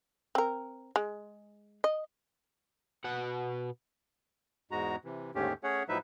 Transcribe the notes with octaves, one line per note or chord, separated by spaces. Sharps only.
C4 A#4
G#3
D#5
B2 F#5
E2 G#2 G#3 F#4 A#5
C3 E3
D#2 G#2 D3 A3 C#4 G4
A3 C#4 G#4 C#5 F#5
A2 F3 F#3 D#4 B4 E5